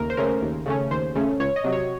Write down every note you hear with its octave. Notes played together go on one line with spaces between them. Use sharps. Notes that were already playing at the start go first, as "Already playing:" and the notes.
Already playing: D#2 C#3 A3 C#4 A#4
C5
C#3 A3 C#4 A#4
D#2
C#3 A3 C#4
D#2 C5
C#3 A3 C#4
C#2 C#5
D#5
C3 F#3
C#5